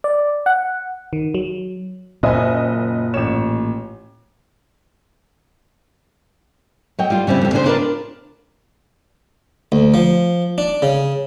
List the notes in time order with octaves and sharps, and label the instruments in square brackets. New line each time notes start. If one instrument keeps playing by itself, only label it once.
[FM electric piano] D5
F#5
D#3
F#3
[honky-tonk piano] F#1 D#5 [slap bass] A#2 [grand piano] E5 G#5
[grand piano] A1 C#5 [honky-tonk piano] E7
[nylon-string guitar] F#3 D#5 G5
G3 F4
C#3 G3 C4 E4
F2 G3
C#3 D4 G#4 C5
D4 F4 A#4 B4 C#5 D5
[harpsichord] D2
F3
D4
C#3